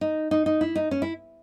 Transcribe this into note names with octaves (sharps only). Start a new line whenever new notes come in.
D#4
D#4
D#4
E4
D#4
C#4
E4